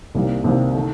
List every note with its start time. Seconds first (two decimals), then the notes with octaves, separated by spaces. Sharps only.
0.15 C2 C3 D#3 G3 A#3
0.44 C2 C3 D#3 G3 A#3
0.74 D#3 A3